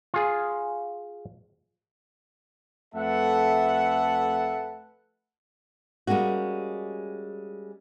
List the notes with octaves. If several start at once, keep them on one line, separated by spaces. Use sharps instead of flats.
F4 G#4
F2 A3 A4 B4 E5 F#5
G3 G#3 A#3 C#4 F#4